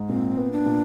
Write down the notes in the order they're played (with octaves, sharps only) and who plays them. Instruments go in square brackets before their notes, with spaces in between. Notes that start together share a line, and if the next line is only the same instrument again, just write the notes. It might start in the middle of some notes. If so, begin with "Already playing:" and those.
Already playing: [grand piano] G#2
[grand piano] A#2 [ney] C4
[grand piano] B3
[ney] D4
[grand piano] A#2